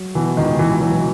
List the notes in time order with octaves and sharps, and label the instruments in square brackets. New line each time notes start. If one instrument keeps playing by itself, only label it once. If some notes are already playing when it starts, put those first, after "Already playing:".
Already playing: [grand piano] F#3
[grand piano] B2 [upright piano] E3
[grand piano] C#2 [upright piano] D#3
[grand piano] C#2 [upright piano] E3
[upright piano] E3 [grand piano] F#3